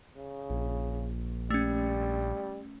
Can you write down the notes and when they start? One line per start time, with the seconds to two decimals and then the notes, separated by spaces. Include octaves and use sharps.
0.17 C#3
0.50 A#1
1.50 G3 A3 C#4